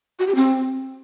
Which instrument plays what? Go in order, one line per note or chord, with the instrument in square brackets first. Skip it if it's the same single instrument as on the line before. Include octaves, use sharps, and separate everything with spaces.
[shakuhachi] F#4
G4
C4